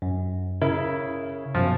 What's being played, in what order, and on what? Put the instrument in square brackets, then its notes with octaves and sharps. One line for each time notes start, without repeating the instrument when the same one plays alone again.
[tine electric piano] F#2
[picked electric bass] C#3 [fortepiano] E4 [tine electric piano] A#4
[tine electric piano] F#2 B2 [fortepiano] F3